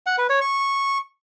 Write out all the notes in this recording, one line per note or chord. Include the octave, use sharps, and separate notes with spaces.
F#5
B4
C#5
C#6